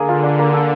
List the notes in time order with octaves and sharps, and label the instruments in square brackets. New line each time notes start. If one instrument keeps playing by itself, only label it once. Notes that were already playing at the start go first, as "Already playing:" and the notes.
Already playing: [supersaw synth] D3 [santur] A#3 G#4
[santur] F4
D4
A#3
A4